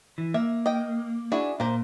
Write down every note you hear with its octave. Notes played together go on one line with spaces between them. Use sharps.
E3
A#3 E5
D#5 G5
D4 E4 F#4 G#4
A#2 A#3 C5